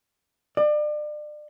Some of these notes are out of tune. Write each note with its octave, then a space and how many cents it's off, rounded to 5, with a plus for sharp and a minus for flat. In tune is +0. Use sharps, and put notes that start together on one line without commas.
D5 +35